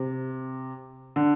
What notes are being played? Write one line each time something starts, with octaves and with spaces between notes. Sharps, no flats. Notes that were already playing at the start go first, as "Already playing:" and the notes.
Already playing: C3
D3